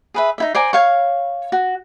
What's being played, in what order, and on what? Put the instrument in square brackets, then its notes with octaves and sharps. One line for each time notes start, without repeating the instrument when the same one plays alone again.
[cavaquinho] G#4 B4 E5
D#4 E4 E5
C5 D5 G#5 A#5
C#5 F5 C#6
F#4